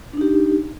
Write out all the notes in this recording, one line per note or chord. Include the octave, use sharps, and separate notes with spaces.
D4 D#4 G4